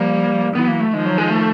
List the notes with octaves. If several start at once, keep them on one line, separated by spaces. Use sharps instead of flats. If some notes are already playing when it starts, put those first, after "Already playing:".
Already playing: F3 G3 A#3
E3 F#3 B3
A#3
A3
D#3 F3 G#3
F#3
G#3
A3